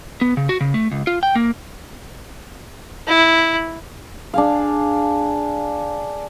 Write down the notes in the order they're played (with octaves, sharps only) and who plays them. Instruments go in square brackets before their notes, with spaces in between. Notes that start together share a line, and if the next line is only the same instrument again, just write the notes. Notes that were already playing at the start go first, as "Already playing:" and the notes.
[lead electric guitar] B3
C#3
F#4
C#3
A3
C#2
F4
G5
A#3
[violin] E4
[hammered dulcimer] D4 G#4 F5